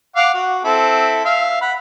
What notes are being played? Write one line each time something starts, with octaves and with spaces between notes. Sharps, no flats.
F5 F#5 D6
F#4
C4 E4 A4
E5 F5
F#5 B5